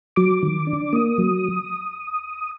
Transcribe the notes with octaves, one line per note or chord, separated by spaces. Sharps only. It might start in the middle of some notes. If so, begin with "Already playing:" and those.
F#3 D6
D#3
D4
A#3 D#6
F#3